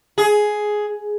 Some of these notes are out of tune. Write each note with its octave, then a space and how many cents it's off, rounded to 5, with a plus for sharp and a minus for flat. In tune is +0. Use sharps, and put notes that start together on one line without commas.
G#4 +10